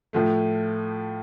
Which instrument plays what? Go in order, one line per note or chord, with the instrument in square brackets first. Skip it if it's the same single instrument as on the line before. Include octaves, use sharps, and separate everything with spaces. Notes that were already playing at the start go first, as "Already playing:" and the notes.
[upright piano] A2 F3 A3